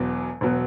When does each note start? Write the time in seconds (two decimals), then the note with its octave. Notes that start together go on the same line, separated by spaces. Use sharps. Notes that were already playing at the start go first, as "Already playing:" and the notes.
Already playing: E1 E2 B2 F#3
0.41 E1 B2 F#3